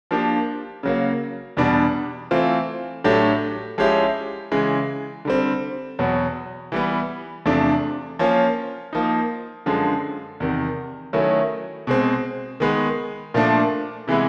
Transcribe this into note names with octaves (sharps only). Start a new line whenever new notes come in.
F3 A#3 D4 G4
C#3 F#3 A#3
E2 B2 G3 B3 D4
E3 A3 C4 F4
A2 F#3 A3 D4 G4
F3 G#3 C#4 E4 G4
C#3 E3 G#3
D3 G3 C4
E2 B2 F#3 B3
E3 G3 B3
E2 C3 F3 A3 D4
F3 A#3 C#4 F4
F3 A#3 D#4
F#2 D3 F3 G#3
E2 C3 D#3
D#3 F#3 A3 C#4 E4
B2 G#3 C4
D#3 G#3 B3
A#2 F3 A3 D4
C3 E3 G#3 B3 E4